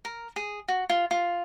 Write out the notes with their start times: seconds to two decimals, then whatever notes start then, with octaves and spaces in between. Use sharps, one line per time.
0.05 A#4
0.36 G#4
0.68 F#4
0.89 F4
1.11 F4